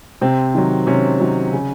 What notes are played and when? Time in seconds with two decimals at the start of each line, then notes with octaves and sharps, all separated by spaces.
0.21 C3 C4
0.55 D#3 F#3
0.87 C3 C#4
1.20 D#3 F#3
1.53 C#3